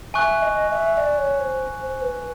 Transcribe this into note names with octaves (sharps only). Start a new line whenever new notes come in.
E5 G#5 C#6 F#6
D#5
E5
D5
C#5
C5
C5
B4